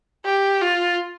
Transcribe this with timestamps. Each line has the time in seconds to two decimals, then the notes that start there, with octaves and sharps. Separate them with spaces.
0.25 G4
0.62 F4